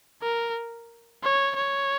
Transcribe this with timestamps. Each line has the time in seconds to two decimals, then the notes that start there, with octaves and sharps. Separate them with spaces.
0.22 A#4
1.23 C#5
1.56 C#5